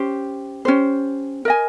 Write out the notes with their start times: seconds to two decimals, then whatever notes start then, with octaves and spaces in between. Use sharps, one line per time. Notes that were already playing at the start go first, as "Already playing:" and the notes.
Already playing: C#4 G4 C5
0.65 C#4 G4 C5
1.45 A#4 D#5 G#5